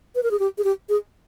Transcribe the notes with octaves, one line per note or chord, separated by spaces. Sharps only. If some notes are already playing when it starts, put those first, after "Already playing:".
B4
A#4
G#4
G4
G#4
G4
G#4